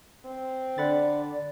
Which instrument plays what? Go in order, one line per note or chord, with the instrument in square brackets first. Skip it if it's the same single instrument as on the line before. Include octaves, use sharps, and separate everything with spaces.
[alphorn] C4
[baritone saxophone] D3 [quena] D5 [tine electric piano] F#5 B5 A6